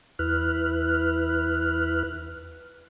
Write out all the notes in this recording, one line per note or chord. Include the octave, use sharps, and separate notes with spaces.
E2 E4 B4 F6 F#6